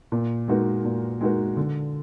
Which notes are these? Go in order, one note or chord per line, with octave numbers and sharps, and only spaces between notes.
A#2
G#3 D#4 F#4 A#4
A#2
G#3 D#4 F#4 A#4
D3